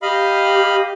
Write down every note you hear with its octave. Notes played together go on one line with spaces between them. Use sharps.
G4 D#5 F5 B5